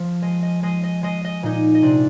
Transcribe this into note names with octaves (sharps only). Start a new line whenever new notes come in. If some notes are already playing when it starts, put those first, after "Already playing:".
Already playing: F3
G#3 D#5
D#5
G#3 D#5
D#5
G#3 D#5
D#5
A#2 D#4 D#5
D#5
C3 D4 D5